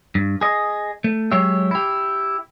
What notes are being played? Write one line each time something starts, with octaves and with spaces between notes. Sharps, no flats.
G2
G#4 D#5
A3
F#3 G#3 G4 C#5 E5
E4 G4